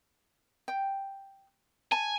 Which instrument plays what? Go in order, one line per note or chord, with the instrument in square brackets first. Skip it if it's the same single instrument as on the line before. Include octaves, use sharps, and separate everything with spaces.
[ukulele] G5
[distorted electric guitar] G#5 [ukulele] A5